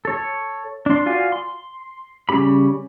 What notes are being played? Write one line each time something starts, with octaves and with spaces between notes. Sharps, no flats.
A4 C#5
D4 C6
F4 F#4 D5 F5 G#5
C6
C#3 G3 C#4 G4 B5